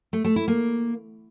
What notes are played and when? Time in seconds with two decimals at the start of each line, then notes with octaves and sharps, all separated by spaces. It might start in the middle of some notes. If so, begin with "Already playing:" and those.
0.13 A3
0.24 A3
0.36 E4
0.48 A#3